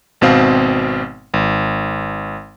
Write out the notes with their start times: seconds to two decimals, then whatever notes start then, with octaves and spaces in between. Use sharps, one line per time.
0.21 G#1 B2 C4 F5
1.34 G#1